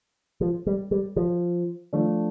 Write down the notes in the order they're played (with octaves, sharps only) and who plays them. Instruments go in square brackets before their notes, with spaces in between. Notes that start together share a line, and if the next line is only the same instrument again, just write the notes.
[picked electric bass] F3
G3
G3
F3
[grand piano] F3 A3 D4